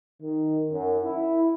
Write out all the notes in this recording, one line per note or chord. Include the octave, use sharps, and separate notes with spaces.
D#3
F#2
E4